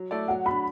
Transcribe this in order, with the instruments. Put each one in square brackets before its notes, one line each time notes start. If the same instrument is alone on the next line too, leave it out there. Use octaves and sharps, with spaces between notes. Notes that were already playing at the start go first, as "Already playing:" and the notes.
Already playing: [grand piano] F#3
A3 E4 A4 D5
[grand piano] F#3 [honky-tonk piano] F#5
[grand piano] D4 F#4 [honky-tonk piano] B5